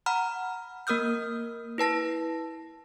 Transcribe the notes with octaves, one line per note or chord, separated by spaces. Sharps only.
F#5 A#5 B5 F6
A#3 A#4 D#6 F6 G6
E4 B4 A5 A#6